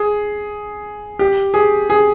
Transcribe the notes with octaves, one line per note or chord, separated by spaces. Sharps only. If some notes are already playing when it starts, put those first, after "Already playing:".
Already playing: G#4
G4
G#4
G#4